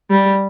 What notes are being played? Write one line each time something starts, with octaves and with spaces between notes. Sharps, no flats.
G3